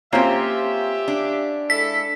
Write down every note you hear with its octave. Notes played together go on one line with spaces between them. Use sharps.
A#3 C4 C#4 F4 G4 C5 E5
D4
G#3 E4 A4 B6